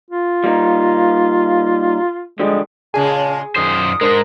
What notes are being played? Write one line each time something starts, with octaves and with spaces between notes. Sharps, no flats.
F4
G3 A#3 D#4
D3 F3 G3 G#3
A#2 C#3 G#3 G#4 A5
F#2 A#2 D#3 C5 D#6
G#2 G#3 D4 A#4 C5 A#5